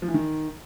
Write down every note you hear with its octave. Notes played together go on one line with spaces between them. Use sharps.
F3
E3
D#3